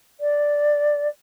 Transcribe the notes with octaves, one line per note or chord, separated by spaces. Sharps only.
D5